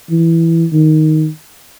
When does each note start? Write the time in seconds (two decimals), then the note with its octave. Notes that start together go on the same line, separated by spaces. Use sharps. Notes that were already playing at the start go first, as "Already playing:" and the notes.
0.10 E3
0.72 D#3